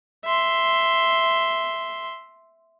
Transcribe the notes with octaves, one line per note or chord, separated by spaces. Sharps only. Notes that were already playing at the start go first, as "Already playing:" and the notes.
E5 C6